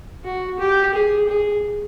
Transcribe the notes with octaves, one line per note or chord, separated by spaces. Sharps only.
F#4
G4
G#4
G#4